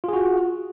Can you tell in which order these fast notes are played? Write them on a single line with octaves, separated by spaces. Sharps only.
F4 G#4 F#4